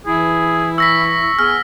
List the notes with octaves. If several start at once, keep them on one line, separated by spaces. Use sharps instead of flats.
E3 E4 G#4
C#6 E6 A#6 B6
B3 G#4 G#5 F6